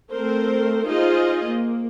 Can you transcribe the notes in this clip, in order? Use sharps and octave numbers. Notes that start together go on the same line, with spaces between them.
A3 C4 A#4 C5
D#4 F4 G#4 C5 D#5
A#3